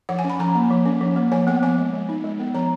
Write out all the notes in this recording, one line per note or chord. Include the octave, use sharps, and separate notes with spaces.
F3 F#5
G#5
C#4
B5
F3 A#5
A#3
F3
C#4
F3
A#3
F3 G#5
B3 F#5
F3 G#5
G#3
G#3
D#4
G#3
B3
F3 A#5